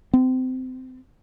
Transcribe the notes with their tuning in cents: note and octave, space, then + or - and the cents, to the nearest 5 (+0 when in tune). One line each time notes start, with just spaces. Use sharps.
C4 -25